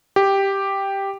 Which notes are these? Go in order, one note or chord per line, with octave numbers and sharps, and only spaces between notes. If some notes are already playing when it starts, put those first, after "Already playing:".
G4